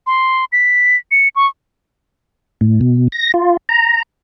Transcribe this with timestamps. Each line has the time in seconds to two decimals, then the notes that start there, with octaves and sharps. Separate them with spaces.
0.07 C6
0.52 B6
1.11 C#7
1.36 C#6
2.61 A2
2.81 B2
3.12 A#6
3.34 F4
3.69 A#5